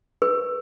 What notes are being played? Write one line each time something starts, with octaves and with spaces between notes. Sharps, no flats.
B4